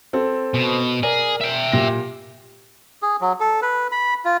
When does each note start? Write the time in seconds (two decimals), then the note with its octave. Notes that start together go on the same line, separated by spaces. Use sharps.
0.13 C4 A4
0.54 B2
1.03 G#4 A#4 D5
1.41 E5 G5
1.72 A#2 G4 A#6
3.02 G#4
3.21 F#3
3.40 A4
3.62 B4
3.92 B5
4.25 F4